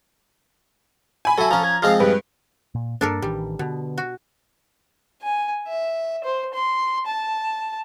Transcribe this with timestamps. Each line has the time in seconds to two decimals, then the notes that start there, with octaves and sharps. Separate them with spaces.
1.25 G#5 B5
1.38 F#3 E4 A4
1.51 F3 C#4 A#5
1.64 G#6
1.82 F3 G#3 C4 F5
2.00 G2 B4
2.75 A#2
3.01 G2 A#3 D4 A4 A#4
3.22 A1 D#3 E3 G3
3.59 B2 D3 B3
3.98 F#4
5.22 G#5
5.68 E5
6.24 C5
6.54 C6
7.06 A5